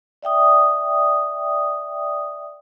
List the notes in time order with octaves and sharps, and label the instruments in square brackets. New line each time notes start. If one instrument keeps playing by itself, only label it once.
[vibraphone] D5 E5 G5 D#6